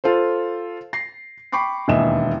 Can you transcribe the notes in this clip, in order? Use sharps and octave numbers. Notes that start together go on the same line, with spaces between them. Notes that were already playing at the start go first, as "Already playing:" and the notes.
F4 A4 C5
A#6 C7
G5 B5 C#6 D6 C7
E1 D#2 E3 D#5 E5 E7